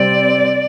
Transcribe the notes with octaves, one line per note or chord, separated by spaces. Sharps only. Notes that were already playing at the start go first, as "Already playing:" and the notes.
Already playing: C3 G3 C4 D5